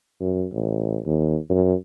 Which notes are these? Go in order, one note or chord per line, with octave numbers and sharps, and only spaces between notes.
F#2
A1
D#2
F#2